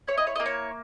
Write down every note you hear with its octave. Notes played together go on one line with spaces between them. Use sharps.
E4 C#5
D#5
C#5
A#3 D#5
C#5